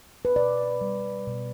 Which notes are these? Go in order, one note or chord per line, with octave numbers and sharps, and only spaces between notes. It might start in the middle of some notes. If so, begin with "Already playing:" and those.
B4
B2 D5
G3
B2